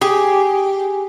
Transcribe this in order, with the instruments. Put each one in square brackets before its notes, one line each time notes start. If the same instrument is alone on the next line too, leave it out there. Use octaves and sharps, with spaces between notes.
[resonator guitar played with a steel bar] G4 [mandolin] G#4